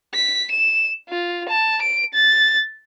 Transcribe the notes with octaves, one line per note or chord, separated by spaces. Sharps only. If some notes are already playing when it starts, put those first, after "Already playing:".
B6
E7
F4
A5
D7
A6